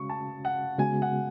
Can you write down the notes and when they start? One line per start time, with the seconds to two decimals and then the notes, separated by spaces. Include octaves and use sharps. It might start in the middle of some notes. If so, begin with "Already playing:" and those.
Already playing: C#3 G#3 C#4 F#4 C#6
0.10 A5
0.45 F#5
0.79 C#3 G#3 B3 F#4 G#5
1.02 F#5